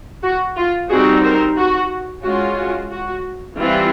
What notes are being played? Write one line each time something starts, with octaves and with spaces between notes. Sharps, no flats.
F#4
F4
G3 C4 D#4 F#4 G#4
A#4 C5
F#4
G#3 C#4 F4 F#4
F#4
F#4
E3 G3 C4 E4 F4